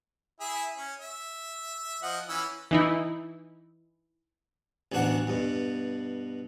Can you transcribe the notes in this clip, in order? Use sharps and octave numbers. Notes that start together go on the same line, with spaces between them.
E4 G#4 E5
C#4
E5
F3 D#5 F#5
E3 C#4 E6
E3 D#4 E4
A1 D2 B2 D4 F#4 F#5
G2 B2